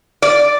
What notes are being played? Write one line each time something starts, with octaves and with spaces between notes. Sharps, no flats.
D5